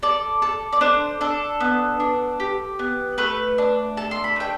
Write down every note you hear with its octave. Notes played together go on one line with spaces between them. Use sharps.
A4 D5
A4
D5
D4 C5
D4 A4
B3
D4
G4
B3
A3 B4
D4
A4 A5
C6
B5
A3 G5